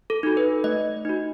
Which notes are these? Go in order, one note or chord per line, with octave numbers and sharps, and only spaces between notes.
A4
D#4 F#4
B4
A3 D#5
D#4 F#4